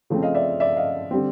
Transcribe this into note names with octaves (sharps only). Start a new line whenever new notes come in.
C#3 F3 A3 C4
D#5 F5
D5 E5
D5 E5
D#5 F5
D3 G3 C4